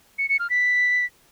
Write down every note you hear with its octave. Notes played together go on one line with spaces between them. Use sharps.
C#7
C#7
F6
B6